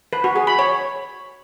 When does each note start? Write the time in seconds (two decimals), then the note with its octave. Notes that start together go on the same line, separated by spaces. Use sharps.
0.13 B4
0.24 F#4
0.36 G#4
0.47 B5
0.59 C#5